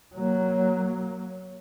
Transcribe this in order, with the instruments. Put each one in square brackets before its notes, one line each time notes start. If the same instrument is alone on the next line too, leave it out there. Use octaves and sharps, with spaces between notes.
[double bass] F#3 A#3